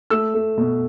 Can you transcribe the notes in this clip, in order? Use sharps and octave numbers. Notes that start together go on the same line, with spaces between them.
A3 E6
A3
B2